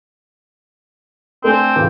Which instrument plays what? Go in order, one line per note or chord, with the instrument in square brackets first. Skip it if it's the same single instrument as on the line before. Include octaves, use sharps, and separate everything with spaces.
[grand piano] A3 D4 G#5 [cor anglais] C4
[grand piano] C#2 E3